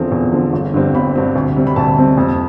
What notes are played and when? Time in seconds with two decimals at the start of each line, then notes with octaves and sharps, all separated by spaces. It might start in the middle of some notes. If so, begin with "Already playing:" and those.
Already playing: E2 D3 F3 A3 C4
0.12 E2
0.32 D3 F3 A3 C4
0.53 G1
0.74 G2 D3 G3 C4
0.94 G1 B5
1.15 G2 D3 G3 C4
1.36 D2
1.56 C3 G3 C4
1.67 B5
1.76 D2 A5
1.97 C3 G3 C4
2.18 F2